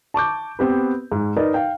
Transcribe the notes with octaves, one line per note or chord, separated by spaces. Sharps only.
A5 C#6 D6 G6
B3 C4 G4 B4
G#2
D#4 A#4 B4 D5 D#5
F5 G5